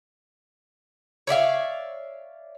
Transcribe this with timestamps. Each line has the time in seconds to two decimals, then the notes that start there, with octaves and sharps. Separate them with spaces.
1.27 C#5 D5 E5 F5